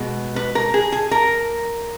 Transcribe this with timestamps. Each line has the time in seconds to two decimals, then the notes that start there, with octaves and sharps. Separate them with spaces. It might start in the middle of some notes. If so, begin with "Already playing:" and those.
Already playing: B2 G#3
0.36 B4
0.55 A#4
0.74 G#4
0.92 G#4
1.11 A#4